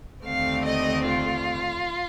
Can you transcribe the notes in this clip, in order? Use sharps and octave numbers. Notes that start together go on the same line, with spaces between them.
D#2 D3 A3 C4 F5
D#5
F4